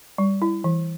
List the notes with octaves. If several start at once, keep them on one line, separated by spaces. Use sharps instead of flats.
G3
E4
E3